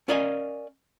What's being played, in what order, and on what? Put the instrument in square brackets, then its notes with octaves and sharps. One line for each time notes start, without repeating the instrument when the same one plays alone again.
[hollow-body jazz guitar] C#4 A#4 D5 D#5 F5 G#5